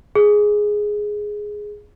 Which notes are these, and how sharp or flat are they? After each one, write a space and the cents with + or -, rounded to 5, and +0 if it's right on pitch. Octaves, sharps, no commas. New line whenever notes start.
G#4 +5